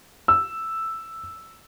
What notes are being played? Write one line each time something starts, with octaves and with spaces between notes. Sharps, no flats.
E6